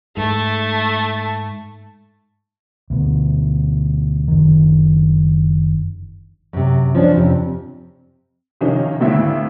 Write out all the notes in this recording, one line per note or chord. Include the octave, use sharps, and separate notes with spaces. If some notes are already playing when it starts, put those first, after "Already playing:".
G#2 A3
D2 B2
F#1 D#3
F#2 C3
F3 C#4 D4
F2 C3
C3 D#3 F3 C#4 D#4
G#1 D2 A2 E5